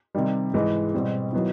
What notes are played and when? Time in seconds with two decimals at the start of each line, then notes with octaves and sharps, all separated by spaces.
0.15 C3 D#3 G3
0.54 G#2 E3 G#3
0.94 B2 G3 C4
1.33 D#3 F#3 B3 E4